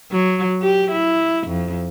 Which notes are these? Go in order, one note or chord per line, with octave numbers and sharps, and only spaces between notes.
F#3
G4
E4
F2